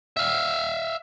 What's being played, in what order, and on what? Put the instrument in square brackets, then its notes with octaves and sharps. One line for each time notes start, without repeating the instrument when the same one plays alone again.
[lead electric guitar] E5 F5